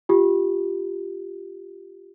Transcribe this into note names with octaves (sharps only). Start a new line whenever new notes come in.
F4 G4